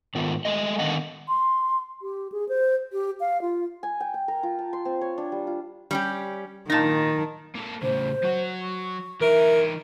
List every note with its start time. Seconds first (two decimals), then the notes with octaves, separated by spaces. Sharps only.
0.15 G#2 D#3 B3 F4
0.45 G#3 A3 D#5
0.79 D3 D#3 B3 D#5 F5 F#5
1.28 C6
2.02 G4
2.32 G#4
2.49 C5
2.93 G4
3.20 F5
3.42 F4
3.83 G#5
4.00 G5
4.14 G5
4.28 A#4
4.43 F4
4.59 A5
4.73 C6
4.85 C4
5.01 C#5
5.18 D4
5.32 G3
5.47 F4
5.91 G3 C#4 G4
6.70 A#2 D#3 D#4 A5 A6 A#6
7.55 A#3 A4
7.82 A2 C#3 C5
8.23 F#3 F#4
8.61 C#6
9.21 E3 D#4 A#4 E5